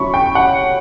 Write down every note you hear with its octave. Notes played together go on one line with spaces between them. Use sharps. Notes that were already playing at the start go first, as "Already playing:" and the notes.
Already playing: F#3 C#4 E4 B5 C#6
G5
F#5